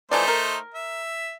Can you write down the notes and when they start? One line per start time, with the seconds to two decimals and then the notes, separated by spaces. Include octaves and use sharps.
0.11 E3 F3 A3 D#4 C5 D5
0.28 A#4
0.74 E5